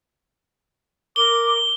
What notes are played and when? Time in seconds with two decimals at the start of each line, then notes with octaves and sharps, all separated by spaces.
1.16 A#4 D6 G7